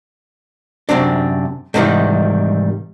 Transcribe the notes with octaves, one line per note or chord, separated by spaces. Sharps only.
F#2 C3 C4 D4
G#2 C3 D#3 E3 G3